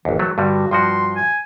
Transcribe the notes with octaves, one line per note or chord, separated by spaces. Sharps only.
G#1 D#2 E3
F#3 A3
G2 D3 G3 F#4
G2 F3 F#4 C6
G#5